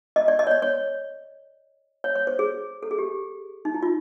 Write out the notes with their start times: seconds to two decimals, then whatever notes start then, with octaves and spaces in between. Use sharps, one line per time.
0.16 D#5
0.28 D5
0.39 D#5
0.47 C#5
0.51 D5
0.62 C#5
2.04 C#5
2.16 C#5
2.27 C5
2.39 G#4
2.83 A4
2.91 G#4
2.98 G4
3.65 D#4
3.74 E4
3.83 F4